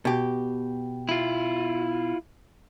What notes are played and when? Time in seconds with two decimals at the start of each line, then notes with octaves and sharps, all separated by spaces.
0.05 B2 G4
1.09 E4 F4